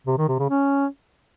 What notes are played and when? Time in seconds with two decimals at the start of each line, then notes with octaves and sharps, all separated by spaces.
0.07 C3
0.18 D#3
0.28 C3
0.39 C#3
0.50 C#4